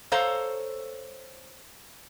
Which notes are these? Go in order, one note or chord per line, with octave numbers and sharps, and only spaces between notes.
A4 C5 C#5 F5 A#5